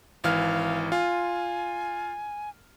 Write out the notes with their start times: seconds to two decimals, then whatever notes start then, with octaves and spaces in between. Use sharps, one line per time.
0.24 G#1 E3 F5 F6
0.92 F4 G#5